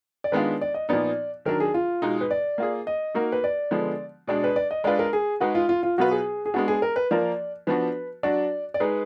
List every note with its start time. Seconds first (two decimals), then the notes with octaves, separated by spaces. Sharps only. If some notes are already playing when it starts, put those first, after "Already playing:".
0.24 D5
0.32 D#3 G#3 B3 D4 F4 B4
0.61 D5
0.74 D#5
0.89 A#2 F3 B3 D#4 D5
1.45 D#3 F#3 D4 A#4
1.60 G#4
1.74 F4
2.02 B2 G#3 D#4
2.21 B4
2.31 D5
2.58 A#3 F4 G#4
2.87 D#5
3.15 A#3 D#4 F#4 A#4
3.32 B4
3.44 D5
3.71 D3 F3 G#3 B3
4.27 B2 G#3 D4 D5
4.44 B4
4.56 D5
4.71 D#5
4.84 G#3 D4 F4 B4 D5
4.99 A#4
5.13 G#4
5.40 G#3 D#4 F#4 G#4 B4
5.55 F4
5.69 F4
5.83 F4
5.98 B2 F#3 B3 F4 F#4 B4
6.11 G#4
6.46 G#4
6.54 G#3 B3 D4 F#4
6.68 G#4
6.82 A#4
6.96 B4
7.11 F3 A#3 F4 A#4 D5
7.67 F3 B3 D4 F#4 B4
8.23 F#3 D4 F#4 D5
8.74 D5
8.80 G#3 D#4 G#4 B4